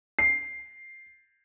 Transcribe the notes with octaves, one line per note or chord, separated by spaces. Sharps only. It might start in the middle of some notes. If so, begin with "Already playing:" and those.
C7